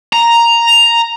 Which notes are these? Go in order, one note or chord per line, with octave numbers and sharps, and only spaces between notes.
A#5